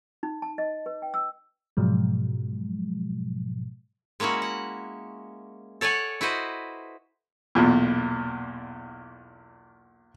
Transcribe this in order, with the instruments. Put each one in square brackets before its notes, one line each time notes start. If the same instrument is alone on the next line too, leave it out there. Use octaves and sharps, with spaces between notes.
[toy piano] D#4
A5
D#5
B4
G5
E6
[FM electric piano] G#2 B2 F3 F#3 G#3
[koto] G#3 A#3 C#4 E4 F#4
F#5
A4 C#5 D5 F#5 G#5
E4 F#4 B4 C5 D#5
[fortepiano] B1 E2 A#2